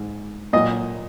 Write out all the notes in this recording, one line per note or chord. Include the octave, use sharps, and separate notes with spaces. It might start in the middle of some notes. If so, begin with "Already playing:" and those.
Already playing: G#2
A#2 F#3 D#5